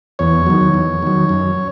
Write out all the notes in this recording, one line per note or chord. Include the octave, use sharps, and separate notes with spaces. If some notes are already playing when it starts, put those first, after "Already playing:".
E2 C#5
D#3 F#3
E2
D#3 F#3
F#2